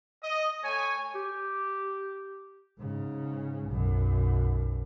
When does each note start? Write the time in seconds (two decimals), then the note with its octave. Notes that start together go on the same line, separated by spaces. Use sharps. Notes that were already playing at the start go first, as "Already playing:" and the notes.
0.23 D#5
0.64 A3 C#5 G#5
1.15 G4
2.79 G#2 C#3
3.67 B1 F#2